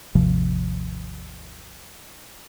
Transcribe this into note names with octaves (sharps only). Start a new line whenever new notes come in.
G#1 D#2 C3 F3